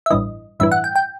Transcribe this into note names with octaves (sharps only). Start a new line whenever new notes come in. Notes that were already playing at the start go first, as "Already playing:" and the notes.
E5
A1 G2 E3 D#5
A1 G2 E3 E5
F#5
G5
G5